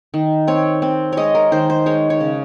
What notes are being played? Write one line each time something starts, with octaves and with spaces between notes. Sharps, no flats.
D#3
C4 C#5
C4
G#3 C#5 D#5
A#4
D#3 C5
C5
G#3 C#5
C#5
C#3